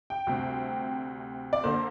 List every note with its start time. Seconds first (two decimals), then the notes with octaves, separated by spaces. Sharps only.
0.10 G5
0.27 D2 C3 G3 C4
1.53 D5
1.64 D3 A#3 C5